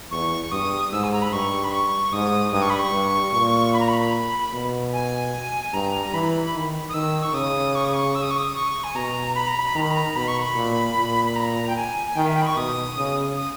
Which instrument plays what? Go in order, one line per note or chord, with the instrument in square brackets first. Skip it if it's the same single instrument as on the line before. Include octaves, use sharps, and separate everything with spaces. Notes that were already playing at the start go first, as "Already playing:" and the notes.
[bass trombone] E2 [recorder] C#6
[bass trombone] G2 [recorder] D#6
[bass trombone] G#2 [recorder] E6
[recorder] G#5
A#5
B5
[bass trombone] G2 [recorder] C#6
[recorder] B5
C#6
[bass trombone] G#2 [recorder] D#6
[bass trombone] G2 [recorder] D#6
[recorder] C#6
B5
C#6
[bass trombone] G2
A#2
[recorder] B5
A#5
B5
[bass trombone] B2
[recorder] G#5
[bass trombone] G2 [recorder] A#5
[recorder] A#5
[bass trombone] E3 [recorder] B5
[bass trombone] D#3
[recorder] D#6
[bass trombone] D#3 [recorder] E6
[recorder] C#6
[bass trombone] C#3 [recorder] D#6
[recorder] C#6
D#6
C#6
E6
D#6
C#6
D#6
C#6
G#5
[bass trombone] B2 [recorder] A#5
[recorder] B5
A#5
B5
[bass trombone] D#3 [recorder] A#5
[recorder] B5
A#5
[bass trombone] B2 [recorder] B5
[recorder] C#6
B5
[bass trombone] A#2
A#2
[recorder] B5
A#5
G5
G#5
G#5
[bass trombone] D#3 [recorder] G5
[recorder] E5
G5
B5
C#6
[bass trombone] B2 [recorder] D#6
[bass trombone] C#3
[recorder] D#6